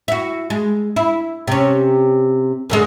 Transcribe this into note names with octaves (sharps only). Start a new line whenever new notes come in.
E4 F#4
G#3
E4
C3 C#4
F#2 D3 G#3